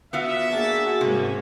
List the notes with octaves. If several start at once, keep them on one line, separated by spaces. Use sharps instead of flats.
B3 F4 F#4 E5
A#3 D4 F#4 G#4 F#5 A6
G#2 C3 A#3 C#4